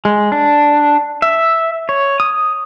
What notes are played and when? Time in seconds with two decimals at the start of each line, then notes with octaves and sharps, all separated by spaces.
0.05 G#3
0.32 D4
1.22 E5
1.89 C#5
2.20 D#6